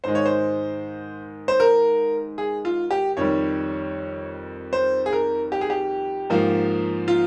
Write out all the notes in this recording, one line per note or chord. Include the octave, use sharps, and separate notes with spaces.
G#2 D#3 G#3 C5
C#5
C5
C5
A#4
G#4
F4
G4
F2 D#3 G3 C#5
C5
G#4
A#4
G4
G#4
G4
G#2 F3 A#3
F4